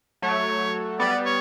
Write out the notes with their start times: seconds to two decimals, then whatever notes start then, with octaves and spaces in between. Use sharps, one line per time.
0.22 F#3 A3 C#5
0.99 G3 B3 D5
1.25 C#5